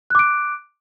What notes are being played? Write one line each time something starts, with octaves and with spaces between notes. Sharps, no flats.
D6 F#6 D7